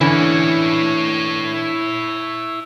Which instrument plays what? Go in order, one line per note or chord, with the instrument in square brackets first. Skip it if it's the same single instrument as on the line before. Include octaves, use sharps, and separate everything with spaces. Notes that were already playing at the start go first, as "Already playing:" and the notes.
[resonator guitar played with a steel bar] D3 E3 C#4 [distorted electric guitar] E4 C#5